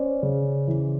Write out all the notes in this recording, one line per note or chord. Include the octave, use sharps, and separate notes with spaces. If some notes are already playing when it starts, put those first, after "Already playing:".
Already playing: C#4 C5 D5
C#3
E3